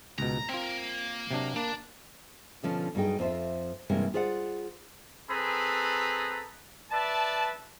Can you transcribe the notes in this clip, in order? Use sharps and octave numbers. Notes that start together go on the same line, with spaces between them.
C#2 B2 A#5
A#3 C4 F4
C3 F#3 D4
A#3 D4
B2 D3 F3 C#4
G2 F#3 D4 D#4 G#4 G5
F2 C4 F4 C5 E5
G2 C3 E3 G#3 A#3 C#4
F4 G#4 C5 D5 E5 F#5
C4 G#4 A4 B4 A#5 B5
B4 D5 E5 A5